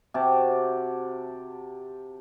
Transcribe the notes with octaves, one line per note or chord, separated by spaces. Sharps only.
C3 F#4 G4 A5